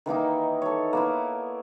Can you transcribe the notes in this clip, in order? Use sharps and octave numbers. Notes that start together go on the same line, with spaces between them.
D#3 E3 A#3 D#4
A4 C#5
A#3 B3 E4